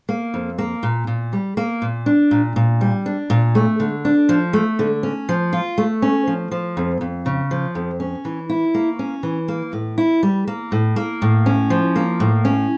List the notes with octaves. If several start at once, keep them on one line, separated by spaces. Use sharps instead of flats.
A#3
F2
A#3
A#2
A#2
G3
A#3
A#2
D4
A#2
A#2
G3
D4
A#2
A3
D3
D4
F3
A3
D3
C#4
F3
F4
A3
C#4
F3
F3
F2
F2
C#3
F3
F2
C#4
E3
E4
A#3
C#4
E3
A#3
A2
E4
G3
A#3
A2
A#3
A2
C#4
F3
A#3
A2
C#4